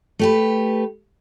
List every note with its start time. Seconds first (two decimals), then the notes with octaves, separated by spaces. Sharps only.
0.19 A3 G4 B4